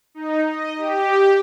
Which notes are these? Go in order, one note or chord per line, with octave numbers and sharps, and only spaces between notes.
D#4
D#5
G4